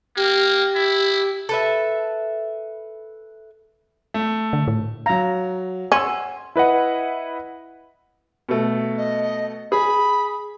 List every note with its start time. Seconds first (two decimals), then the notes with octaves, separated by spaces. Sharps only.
0.16 A#3 G4
0.75 E4
1.49 A4 B4 E5
4.14 A3
4.53 D3
4.68 A2
5.06 F#3 F5 A#5
5.92 C#4 F#5 C6 E6
6.56 E4 B4 D#5 F#5
8.49 B2 A3
8.98 D#5
9.72 G#4 B5